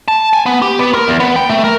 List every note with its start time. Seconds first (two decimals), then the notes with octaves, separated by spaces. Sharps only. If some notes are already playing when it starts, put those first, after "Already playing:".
0.08 A5
0.33 G#5
0.46 B3
0.62 G4
0.79 B3
0.94 A#4
1.08 E2
1.20 B3
1.36 G5
1.49 A3
1.64 A#4